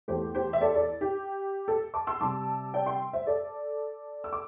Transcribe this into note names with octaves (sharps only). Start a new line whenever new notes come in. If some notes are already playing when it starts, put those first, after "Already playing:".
E2 E3 A3 G4 C5
G4 C5
E5
A4 D5
A4 D5
G4
A4
A5 D6
C6 E6
C3 G3 A5 D6
D5 G5
G5 C6
C5 E5
A4 D5
E6
D6